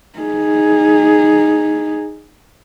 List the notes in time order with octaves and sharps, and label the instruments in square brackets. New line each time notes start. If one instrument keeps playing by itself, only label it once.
[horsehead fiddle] D#4 G#4